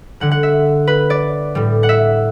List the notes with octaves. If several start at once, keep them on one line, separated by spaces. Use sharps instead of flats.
D3 G3 F#5
F#5
E5
B4
D5
A2 G3
F#5
E5